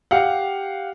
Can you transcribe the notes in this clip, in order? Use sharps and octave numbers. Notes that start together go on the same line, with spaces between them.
G4 F5 F#5